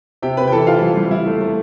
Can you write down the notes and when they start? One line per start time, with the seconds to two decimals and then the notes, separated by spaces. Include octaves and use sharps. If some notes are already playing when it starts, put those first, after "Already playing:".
0.22 C3 G4 G5
0.37 C4 B4 B5
0.47 G5
0.52 E3 A4 A5
0.67 E3 F4 F5
0.82 G3
0.97 G3
1.11 E4
1.26 A3
1.41 A3